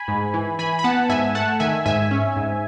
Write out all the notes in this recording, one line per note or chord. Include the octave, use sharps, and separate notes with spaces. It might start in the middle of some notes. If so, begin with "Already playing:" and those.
Already playing: G#5 B5
G#2
E3
E3 G#5 B5
B5
B3 F#5 A5
G#2 E5 G#5
A3 F#5 A5
D#3 E5 G#5
G#2 E5 G#5
C#4
G#2